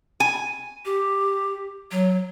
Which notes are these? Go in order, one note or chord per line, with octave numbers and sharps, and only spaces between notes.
G#5
G4
F#3